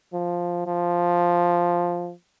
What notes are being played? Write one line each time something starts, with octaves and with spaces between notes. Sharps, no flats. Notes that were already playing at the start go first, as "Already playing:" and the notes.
F3
F3